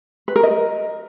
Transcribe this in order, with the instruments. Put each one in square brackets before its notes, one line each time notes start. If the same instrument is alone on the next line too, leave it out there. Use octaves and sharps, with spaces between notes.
[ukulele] B4
A#4
D#5